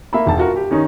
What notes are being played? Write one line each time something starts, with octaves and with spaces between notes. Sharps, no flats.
A#3 E5 B5
E1 A5
F4 F#4 A#4
G4
D#3 C#4 D#4